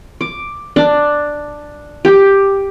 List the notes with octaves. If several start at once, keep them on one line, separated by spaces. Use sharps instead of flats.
D6
D4
G4